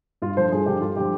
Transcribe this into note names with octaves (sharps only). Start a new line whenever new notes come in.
G2 F4
D3 F3 C5
G2 G#4
D3 F3 G4
G2 F4
D3 F3 G4